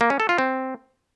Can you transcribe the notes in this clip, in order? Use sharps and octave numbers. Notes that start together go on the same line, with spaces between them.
A#3
C#4
A4
F4
C4